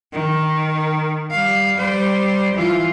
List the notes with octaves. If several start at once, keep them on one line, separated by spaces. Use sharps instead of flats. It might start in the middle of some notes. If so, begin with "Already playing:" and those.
D#3
G3 F5
G3 C5
E3 F4